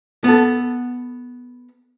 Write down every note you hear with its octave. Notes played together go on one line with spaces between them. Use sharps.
B3 A4